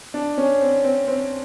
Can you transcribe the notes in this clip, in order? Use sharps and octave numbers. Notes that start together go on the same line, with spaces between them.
D4
C#4
C4
C4
C4